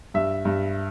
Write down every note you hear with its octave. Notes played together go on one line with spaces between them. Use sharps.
G2 E5
G2